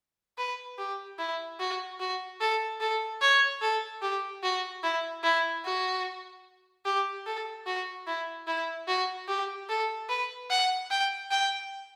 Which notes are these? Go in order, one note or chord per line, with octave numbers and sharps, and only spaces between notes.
B4
G4
E4
F#4
F#4
A4
A4
C#5
A4
G4
F#4
E4
E4
F#4
G4
A4
F#4
E4
E4
F#4
G4
A4
B4
F#5
G5
G5